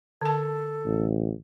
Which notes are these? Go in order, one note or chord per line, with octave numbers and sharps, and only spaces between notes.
D3 A4 A5
A1